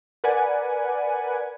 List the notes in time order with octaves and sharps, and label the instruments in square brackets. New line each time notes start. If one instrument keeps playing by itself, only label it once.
[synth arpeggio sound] A#4 B4 D5 F#5 G#5